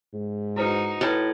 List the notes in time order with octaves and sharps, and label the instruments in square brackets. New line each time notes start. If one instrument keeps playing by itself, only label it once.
[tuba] G#2
[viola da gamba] D#4 F#4 [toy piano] E4 B4 C5
[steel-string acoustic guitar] A2 [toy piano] F4 B4 A5